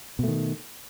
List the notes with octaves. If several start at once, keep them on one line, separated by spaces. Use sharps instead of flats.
B2 D#3 A3